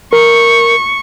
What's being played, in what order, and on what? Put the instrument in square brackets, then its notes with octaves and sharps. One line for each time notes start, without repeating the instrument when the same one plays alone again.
[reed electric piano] A#4 [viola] C#6